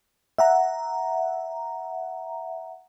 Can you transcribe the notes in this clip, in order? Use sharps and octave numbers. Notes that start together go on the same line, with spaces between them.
E5 F#5 A#5